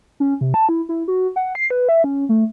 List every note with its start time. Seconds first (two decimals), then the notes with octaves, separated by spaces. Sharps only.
0.20 C#4
0.41 C3
0.54 A5
0.69 E4
0.89 E4
1.08 F#4
1.36 F#5
1.55 C7
1.70 B4
1.89 E5
2.04 C#4
2.29 A3